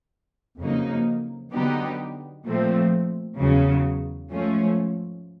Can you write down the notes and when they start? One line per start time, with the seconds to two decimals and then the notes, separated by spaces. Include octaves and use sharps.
0.60 F2 C#3 F#3 A#3 D#4
1.53 D3 F#3 B3 D#4 G4
2.46 A#2 F3 A3 C4
3.39 E2 C#3 F#3
4.31 G#2 F3 A3 C#4